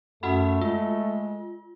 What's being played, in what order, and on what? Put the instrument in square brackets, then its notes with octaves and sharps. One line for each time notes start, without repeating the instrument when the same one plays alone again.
[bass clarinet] F#2 [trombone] A3 [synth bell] F#4 F#5 B5
[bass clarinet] G#3 [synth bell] F4